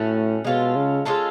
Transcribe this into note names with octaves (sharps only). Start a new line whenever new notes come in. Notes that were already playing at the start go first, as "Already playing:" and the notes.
Already playing: A2 A3 C#4 F#4
B2 G#3 C#4 F4 A4
C#3
G#3 C#4 F4 A4